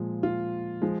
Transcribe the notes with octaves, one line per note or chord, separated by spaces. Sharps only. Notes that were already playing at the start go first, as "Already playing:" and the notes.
Already playing: A#2 F3 G#3
F4
F3 G#3